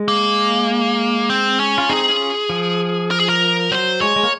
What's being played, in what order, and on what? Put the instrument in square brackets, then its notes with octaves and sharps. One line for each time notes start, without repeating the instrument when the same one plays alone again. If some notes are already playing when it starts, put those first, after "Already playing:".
Already playing: [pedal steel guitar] G#3
[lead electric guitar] A#3
C4
C#4
[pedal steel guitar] F4
[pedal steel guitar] C4 D#4 [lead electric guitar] G#4
[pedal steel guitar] C#4 F4
F3
[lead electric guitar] A#4
G#4
A#4
[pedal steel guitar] F#3 [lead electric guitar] C5
[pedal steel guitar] G#3 [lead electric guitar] C#5
[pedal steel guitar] G#3
A#3